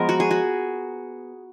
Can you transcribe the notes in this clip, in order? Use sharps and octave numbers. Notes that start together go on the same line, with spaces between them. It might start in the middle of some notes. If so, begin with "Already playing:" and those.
Already playing: F3 G#3 B3 A#4
F#4
G#4
F#4